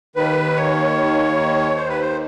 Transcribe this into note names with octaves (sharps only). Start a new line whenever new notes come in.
D#2 D#3 B4
C#5
C5
B4
C5